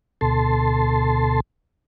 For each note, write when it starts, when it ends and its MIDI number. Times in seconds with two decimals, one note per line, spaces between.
0.21 1.40 38
0.21 1.40 47
0.21 1.40 69
0.21 1.40 81
0.21 1.40 84